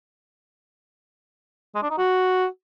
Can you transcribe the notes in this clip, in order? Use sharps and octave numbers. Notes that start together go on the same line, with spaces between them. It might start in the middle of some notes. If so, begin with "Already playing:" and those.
G#3
D4
D#4
F#4